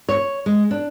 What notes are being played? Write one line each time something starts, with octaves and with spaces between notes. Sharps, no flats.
C#5
G#3
D4